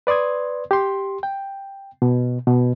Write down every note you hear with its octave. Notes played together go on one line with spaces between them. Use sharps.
B4 D5 C6 D#6 G#6
G4 C6
G5
B2
B2